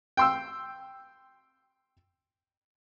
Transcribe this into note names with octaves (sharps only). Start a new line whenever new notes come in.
G5 C6 E6